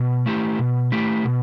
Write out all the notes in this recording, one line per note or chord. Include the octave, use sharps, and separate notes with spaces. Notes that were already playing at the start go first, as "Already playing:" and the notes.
Already playing: B2
A3 E4 G4
B2
A3 E4 G4
B2